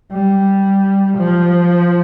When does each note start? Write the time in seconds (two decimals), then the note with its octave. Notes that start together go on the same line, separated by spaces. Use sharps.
0.13 G3
1.18 F3